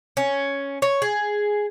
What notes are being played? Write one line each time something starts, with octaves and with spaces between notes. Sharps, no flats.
C#4
C#5
G#4